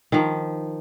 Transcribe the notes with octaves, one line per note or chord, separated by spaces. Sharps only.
D#3 F3